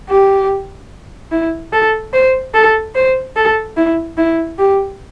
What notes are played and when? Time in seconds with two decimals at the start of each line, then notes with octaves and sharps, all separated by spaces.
0.10 G4
1.32 E4
1.73 A4
2.13 C5
2.54 A4
2.95 C5
3.36 A4
3.77 E4
4.18 E4
4.59 G4